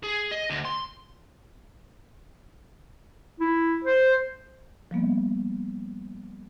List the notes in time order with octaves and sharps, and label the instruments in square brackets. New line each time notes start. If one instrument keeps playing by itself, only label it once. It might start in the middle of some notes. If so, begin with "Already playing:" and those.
[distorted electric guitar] G#4
D#5
D2
C6
[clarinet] E4
C5
[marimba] F3 G3 A#3 B3